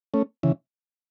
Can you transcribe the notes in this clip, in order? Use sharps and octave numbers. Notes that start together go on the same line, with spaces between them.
A3 C#4
C#3 E3